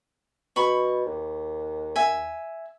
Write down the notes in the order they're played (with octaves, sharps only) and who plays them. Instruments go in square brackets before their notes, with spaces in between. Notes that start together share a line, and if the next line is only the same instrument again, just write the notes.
[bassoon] B2 [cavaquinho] B5 C#6
[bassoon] D#2
[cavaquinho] E5 G#5